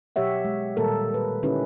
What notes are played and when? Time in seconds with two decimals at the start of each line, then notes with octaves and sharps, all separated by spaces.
0.16 B2 F#3 G4 C#5 E5 F#5
0.45 G#3
0.77 A#2 D#3 G3 A#3 A4 A#4
1.14 B4
1.43 D3 C#4 D#4 E4 G4 B4